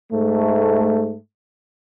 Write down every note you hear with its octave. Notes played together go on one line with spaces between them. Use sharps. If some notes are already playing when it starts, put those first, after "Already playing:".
G#2 A3